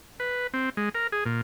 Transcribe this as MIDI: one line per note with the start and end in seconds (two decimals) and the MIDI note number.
0.20 0.47 71
0.54 0.70 60
0.77 0.89 56
0.95 1.07 70
1.12 1.24 68
1.25 1.41 46